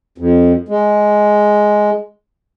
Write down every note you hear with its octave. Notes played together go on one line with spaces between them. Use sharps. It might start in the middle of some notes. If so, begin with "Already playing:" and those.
F2
G#3